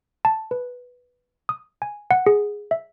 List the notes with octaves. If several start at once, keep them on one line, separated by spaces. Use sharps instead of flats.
A5
B4
D#6
G#5
F#5
G#4
E5